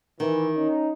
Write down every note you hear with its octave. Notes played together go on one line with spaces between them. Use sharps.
D#3 E3
C#4 D#4